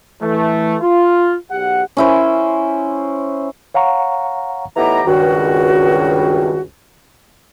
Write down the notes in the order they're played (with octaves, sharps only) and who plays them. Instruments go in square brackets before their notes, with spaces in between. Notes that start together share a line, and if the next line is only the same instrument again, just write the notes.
[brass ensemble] E3 A3
F4
B1 G4 F#5
[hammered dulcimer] C#4 E4 C5
[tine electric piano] C#5 F5 F#5 A#5 C#6
[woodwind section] A2 E3 B3 D#4 G4 A#5
C#2 G2 D#3 F#4